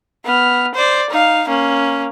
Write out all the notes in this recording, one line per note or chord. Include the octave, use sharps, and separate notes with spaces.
B3 F6
C5 D5
D#4 F5
A#3 C#4